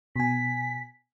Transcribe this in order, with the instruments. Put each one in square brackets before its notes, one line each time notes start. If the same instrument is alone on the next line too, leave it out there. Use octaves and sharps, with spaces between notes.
[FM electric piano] B2 G#5 [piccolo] B6